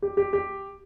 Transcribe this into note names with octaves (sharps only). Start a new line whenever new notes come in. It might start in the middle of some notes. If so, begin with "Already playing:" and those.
G4
G4
G4